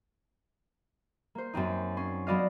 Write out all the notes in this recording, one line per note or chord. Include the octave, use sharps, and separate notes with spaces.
A#3 C5
F#2 A#3 C4 D#4
C#4 C6
F#3 B3 F#4 D5 D#5 F5